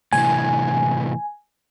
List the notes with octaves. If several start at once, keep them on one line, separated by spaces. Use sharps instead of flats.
A2 C3 E3 G#5